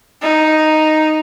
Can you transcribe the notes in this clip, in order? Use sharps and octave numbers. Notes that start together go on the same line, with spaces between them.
D#4